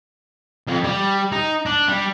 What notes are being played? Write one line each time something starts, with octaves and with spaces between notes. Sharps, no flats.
F2
G3
D#4
D4
G3